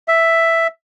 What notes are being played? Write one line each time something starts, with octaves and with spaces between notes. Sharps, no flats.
E5